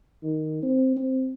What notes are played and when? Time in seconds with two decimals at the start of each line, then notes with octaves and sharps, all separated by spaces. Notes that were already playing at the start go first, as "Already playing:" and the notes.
0.23 D#3
0.63 C4
0.96 C4